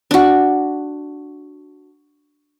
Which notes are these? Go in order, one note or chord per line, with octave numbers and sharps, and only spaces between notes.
D4 F#4